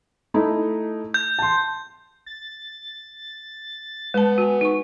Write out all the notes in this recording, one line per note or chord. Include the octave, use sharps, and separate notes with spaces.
A3 D#4 E4
G6
A5 C6
A6
G#3 B3 A5
F#4 G#5
D#4 C#6